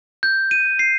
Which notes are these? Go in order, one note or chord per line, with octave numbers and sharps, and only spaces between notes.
G6
D#7
C7